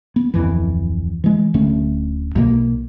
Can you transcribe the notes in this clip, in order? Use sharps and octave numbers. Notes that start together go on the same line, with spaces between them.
B3
D1 G1 F2 E3
E3 G#3
D1 D3 A3 C#4
B1 B2 A#3